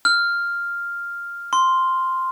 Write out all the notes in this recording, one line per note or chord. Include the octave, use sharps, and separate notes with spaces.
F6
C6